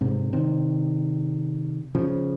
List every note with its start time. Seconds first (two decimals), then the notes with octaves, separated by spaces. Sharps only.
0.01 G#2 C3
0.33 C3 D#3
1.95 C#3 F3